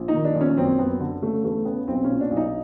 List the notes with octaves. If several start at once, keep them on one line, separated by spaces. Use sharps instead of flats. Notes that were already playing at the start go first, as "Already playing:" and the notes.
Already playing: A#1
D#4
D#3
D4
A#1
C#4
F#2 C4
F#2 B3
D3
C#3 A3
E2 A3
C#3 B3
B1 C4
A#2 C#4
D4
B1
D#4